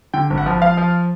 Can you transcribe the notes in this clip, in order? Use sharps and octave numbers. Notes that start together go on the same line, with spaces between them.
D3 G5
G#1
F#5
F3
F3 F5
F3